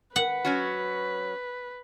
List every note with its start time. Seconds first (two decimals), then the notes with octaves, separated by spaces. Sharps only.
0.16 B4 F#5
0.45 F#3 C#4 F#4